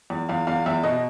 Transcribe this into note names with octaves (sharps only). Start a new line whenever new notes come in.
E2
E2 F5
E2 F5
E2 E5
B2 D#5